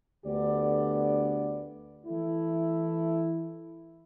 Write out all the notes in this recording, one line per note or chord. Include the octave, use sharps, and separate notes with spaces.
D2 D3 B3 G4 D5
E3 A3 E4